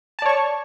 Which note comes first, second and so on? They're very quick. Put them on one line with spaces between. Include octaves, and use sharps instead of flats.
A5 D5 C#5 C#6